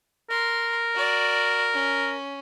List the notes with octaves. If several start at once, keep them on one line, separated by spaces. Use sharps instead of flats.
A#4 C6
F#4 D5
C#4